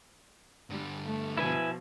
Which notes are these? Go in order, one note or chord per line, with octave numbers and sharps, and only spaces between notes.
G2 D3 G3
A3
B2 F3 E4 B4 G#5